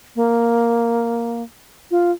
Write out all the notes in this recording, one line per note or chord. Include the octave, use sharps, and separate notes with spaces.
A#3
F4